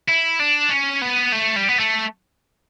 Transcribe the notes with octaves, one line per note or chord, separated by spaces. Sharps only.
E4
D4
C#4
B3
A3
G3
B3
A3